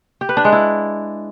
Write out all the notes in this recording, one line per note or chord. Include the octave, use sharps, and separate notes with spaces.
G4
B4
D4
G#3
E4